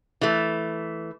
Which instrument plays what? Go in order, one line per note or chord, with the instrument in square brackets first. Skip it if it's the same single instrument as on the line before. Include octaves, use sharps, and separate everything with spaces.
[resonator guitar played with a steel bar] E3 A3